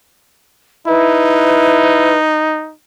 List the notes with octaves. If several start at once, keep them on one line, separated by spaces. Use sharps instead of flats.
D#4 E4 B4